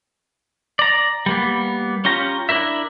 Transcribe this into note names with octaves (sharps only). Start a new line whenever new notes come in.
D5 A#5
G3 A#3 B3
C#4 F4 G4 A#5
D4 E4 A#4 E5